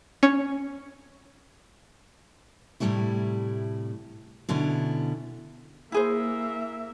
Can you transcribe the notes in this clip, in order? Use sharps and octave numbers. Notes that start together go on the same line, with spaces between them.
C#4
A2 C3 F3 G3 A3 E4
B2 D3 C#4 E4
A#3 E4 G#4 C5 E5